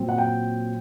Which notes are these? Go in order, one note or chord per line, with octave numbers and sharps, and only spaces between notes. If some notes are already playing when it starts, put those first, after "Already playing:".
Already playing: A#2 F#3 C4
F#5
G5